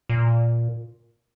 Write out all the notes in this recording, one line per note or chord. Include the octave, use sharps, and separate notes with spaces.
A#2